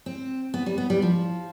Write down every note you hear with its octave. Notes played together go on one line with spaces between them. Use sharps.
C4
B3
G3
B3
G3
F3